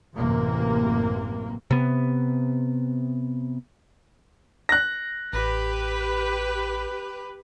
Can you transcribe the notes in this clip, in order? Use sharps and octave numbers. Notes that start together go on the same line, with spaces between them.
A1 F#2 C3 E3 A#3
C3 B3
F#6 A#6
A1 G4 B4